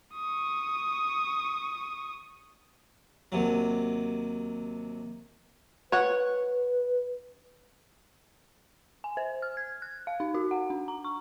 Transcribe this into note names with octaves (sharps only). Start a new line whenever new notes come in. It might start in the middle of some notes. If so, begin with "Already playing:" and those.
C#6 D#6
D#2 C3 F#3
B4 C#5 F#5
G#5
C5
F6
G#6
F#6
F5
D#4
F#4
F#5
D4
A#5
C#6